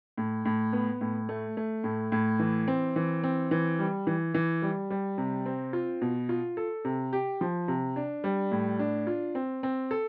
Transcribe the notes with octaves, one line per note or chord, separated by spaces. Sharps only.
A2
A2
B3
A2
A3
A3
A2
A2
E3
C4
E3
C4
E3
G3
E3
E3
G3
G3
C3
C4
F4
B2
F4
A4
C3
G4
F3
C3
D4
G3
A2
D4
F4
C4
C4
A4